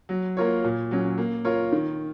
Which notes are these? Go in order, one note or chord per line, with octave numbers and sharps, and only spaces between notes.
F#3
A#3 F4 A#4 C#5
A#2
F#3 C#4
A#3
F4 A#4 C#5
D#3